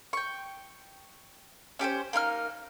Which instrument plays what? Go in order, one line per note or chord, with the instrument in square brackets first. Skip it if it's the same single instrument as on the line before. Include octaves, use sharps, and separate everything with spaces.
[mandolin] G5 C#6
C#4 G4 A#4 C5
A#3 D#4 F5 F6